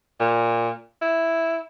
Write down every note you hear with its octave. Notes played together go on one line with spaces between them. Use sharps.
A#2
E4